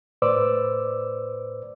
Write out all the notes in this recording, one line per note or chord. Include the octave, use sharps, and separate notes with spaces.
A2 B4 C5 D5 D6 E6